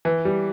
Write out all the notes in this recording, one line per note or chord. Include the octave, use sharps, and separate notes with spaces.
E3
G3